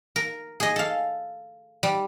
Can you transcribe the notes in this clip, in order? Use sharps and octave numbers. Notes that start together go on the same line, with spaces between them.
A#4
G#4 D#5
A4 F5
G3